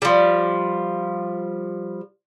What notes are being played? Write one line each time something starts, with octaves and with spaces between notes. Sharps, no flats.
F3 G3